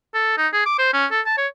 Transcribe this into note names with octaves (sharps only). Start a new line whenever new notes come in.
A4
D#4
G#4
D6
C5
C#4
A4
A5
C#5